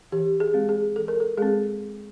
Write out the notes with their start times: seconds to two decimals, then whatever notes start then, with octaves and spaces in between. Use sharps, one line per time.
0.12 E3 G4
0.40 G#4
0.54 G#3 C4
0.69 G#4
0.96 E3 A4
1.08 A#4
1.20 A4
1.37 G#3 C4 G#4